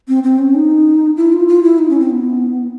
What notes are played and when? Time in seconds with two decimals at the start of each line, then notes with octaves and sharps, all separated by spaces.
0.08 C4
0.24 C4
0.39 C#4
0.55 D#4
1.17 E4
1.33 F4
1.48 F4
1.63 E4
1.79 D#4
1.90 C#4
2.00 C4
2.10 B3